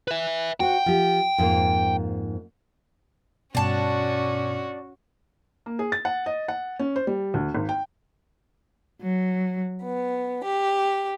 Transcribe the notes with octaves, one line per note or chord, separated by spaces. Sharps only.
B4 E5
F#4 C5 F#5 G5
F3 G4
F2 G#2 A#3
G2 B2 C#4 D4 F#4 A5
A#3
G#4
A6
F#5
D#5
F#5
C#4
C5
G3
D2
G#1
G5
F#3
B3
G4